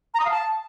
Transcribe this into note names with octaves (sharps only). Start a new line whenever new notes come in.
A#5
D#6
F5
A5